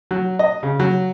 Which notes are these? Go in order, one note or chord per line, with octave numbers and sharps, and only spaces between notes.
F#3
D#5
C#3
F#3